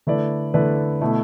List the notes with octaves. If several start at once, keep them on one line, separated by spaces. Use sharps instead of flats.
D3 A3 E4 B4 D5
D3 A3 E4 B4 D5
B2 A3 E4